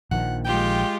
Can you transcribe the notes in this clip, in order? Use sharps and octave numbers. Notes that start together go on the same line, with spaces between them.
A#1 D#3 F3 F#5
G#3 F4 G4 G5